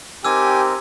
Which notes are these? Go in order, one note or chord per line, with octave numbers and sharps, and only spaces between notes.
C4 D#4 G4 A#4 G#5 D6 E6